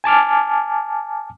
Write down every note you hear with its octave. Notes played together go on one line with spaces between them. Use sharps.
G#5 A5 D6 F6